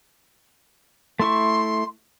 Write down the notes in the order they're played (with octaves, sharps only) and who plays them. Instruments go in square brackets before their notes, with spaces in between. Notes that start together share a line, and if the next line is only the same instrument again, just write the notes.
[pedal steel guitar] A3 E4 C#6 [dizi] C6